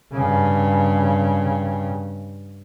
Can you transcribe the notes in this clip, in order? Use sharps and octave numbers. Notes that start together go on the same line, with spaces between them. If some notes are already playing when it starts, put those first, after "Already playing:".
G2 C#3